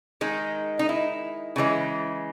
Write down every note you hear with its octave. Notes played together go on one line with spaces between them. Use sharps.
D#3 G#3 D#4
D#4
E4
C#3 E3 G#3